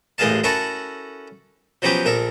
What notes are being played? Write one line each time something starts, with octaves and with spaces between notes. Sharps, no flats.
A1 D#2 G#3 G#4 F5 A5
C#4 E4 F#4 A4 A#4 A5
F3 F#3 B3 C#4 G4
A#1 A4 A#4